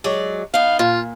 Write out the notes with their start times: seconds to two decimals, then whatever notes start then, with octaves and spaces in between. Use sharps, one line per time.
0.04 F#3 G#3 D5
0.54 B3 D#4 F5
0.79 A#2 F4